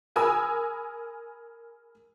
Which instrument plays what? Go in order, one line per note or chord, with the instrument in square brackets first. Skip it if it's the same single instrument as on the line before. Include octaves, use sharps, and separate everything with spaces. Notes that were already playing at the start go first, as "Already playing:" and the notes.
[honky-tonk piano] G#4 A#4 G#5 B5 D#6 E6